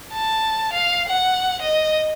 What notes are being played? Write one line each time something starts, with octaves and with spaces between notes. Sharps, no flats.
A5
F5
F#5
D#5